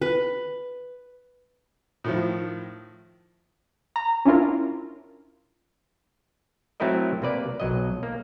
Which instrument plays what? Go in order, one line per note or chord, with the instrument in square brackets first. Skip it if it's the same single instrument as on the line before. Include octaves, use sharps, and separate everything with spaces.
[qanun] B4
[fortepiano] A2 D#3 F3
[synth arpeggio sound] A#5
C#4 D4 E4 F4 A#4
[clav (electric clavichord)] F#3 A3 C4 E4 A#4 D#5
C3 A#3 B4 D5
B1 F#3 D#5
A#3